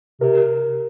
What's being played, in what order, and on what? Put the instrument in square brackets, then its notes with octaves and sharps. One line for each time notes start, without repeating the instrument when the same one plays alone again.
[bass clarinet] C3 [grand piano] A#4